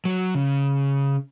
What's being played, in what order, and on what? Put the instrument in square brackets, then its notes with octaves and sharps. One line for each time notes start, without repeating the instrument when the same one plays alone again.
[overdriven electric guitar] F#3
C#3